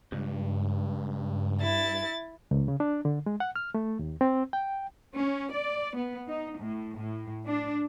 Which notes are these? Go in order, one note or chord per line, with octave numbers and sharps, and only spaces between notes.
C#2 G2
E4 A6
C#2
C#3
D4
D3
G#3
F#5
F6
A3
D#2
C4
G5
C#4
D5
B3
D#4
A2
A2
D4